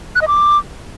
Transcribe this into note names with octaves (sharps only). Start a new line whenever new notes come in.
F#6
D#5
D6